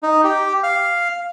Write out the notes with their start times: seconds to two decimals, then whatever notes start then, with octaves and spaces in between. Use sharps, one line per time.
0.03 D#4
0.24 G4
0.63 F5